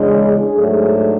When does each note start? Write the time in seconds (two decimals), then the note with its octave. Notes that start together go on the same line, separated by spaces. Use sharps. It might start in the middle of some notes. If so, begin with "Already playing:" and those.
Already playing: E2 C#3 G#3 D4 G#4
0.53 G#2 F#3 A3 D4